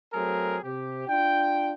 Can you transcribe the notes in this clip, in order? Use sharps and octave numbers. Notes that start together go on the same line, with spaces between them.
F#3 A3 C4 G#4 A#4
C3 G4
D4 F4 G5